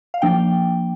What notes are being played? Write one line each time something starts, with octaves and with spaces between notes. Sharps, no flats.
F5
F3 A#3 D4 G5